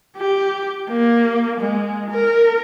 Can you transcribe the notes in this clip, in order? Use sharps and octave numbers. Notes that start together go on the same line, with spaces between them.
G4
A#3
G#3
A#4